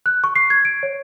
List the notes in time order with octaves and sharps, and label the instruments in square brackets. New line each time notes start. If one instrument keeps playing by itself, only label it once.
[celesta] F#6
C#6
C7
G#6
D7
C#5